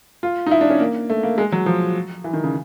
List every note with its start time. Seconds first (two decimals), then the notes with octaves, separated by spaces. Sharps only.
0.23 F4
0.46 D#4
0.51 E4
0.61 D4
0.70 C#4
0.80 A#3
1.10 A3
1.23 A#3
1.38 G#3
1.52 F#3
1.66 F3
2.24 E3
2.33 D#3
2.44 C#3